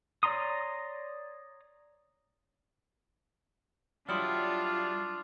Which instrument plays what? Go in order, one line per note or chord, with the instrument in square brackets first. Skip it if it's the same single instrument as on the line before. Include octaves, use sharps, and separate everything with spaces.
[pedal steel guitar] C#5 D5 A#5 C6 D#6
[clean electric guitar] F#3 G3 E4 [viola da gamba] D4 F4 [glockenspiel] C6 D#6 F6